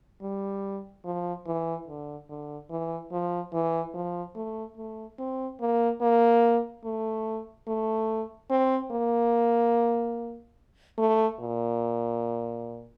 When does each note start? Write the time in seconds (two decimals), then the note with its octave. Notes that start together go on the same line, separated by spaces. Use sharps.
0.22 G3
1.04 F3
1.46 E3
1.87 D3
2.29 D3
2.70 E3
3.12 F3
3.53 E3
3.94 F3
4.36 A3
4.77 A3
5.19 C4
5.60 A#3
6.01 A#3
6.84 A3
7.67 A3
8.50 C4
8.92 A#3
10.98 A3
11.40 A#2